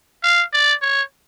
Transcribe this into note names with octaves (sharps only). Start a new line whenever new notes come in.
F5
D5
C#5